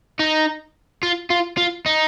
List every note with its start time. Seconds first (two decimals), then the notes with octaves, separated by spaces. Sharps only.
0.19 D#4
1.03 F4
1.30 F4
1.57 F4
1.86 D#4